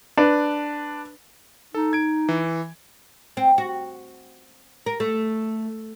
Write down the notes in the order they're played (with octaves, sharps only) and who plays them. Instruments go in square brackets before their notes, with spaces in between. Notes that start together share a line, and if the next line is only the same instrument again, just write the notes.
[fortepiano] D4 B4
[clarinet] D#4 [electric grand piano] A4
[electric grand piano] G#6 D7
E3
[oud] C4
F#4
A#4
A3